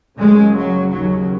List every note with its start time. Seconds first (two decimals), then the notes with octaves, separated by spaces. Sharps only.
0.19 F#1 F#2 C#3 G#3
0.56 F#3
0.92 D#2 C#3 F#3